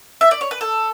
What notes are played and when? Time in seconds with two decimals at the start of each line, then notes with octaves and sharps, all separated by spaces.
0.21 E5
0.31 D5
0.41 C#5
0.51 B4
0.61 A4